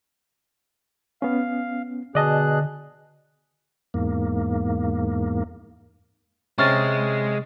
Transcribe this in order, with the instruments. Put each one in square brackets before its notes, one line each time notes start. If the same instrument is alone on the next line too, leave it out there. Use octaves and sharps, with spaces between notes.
[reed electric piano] B3 C#4 [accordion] F5
[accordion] B2 G#4 F#6 [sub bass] D3 [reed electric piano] D5 D#5 A5
[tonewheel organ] E2 G#2 A#3
[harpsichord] C3 C#4 [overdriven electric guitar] G#3 [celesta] C#6 F6 A6